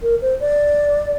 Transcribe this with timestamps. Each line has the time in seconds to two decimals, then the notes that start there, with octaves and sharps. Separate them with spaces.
0.02 A#4
0.22 C5
0.40 D5